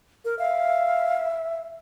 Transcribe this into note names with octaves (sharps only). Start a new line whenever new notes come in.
A#4
E5 F5